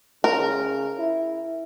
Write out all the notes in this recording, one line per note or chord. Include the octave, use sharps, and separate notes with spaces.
C#3 A#4
E4